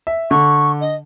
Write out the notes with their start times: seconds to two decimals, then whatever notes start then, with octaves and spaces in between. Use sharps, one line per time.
0.07 E5
0.31 D3 C#6
0.81 D#5